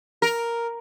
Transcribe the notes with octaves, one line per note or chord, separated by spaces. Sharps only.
A#4